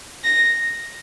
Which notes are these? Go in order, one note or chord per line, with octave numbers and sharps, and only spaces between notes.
A#6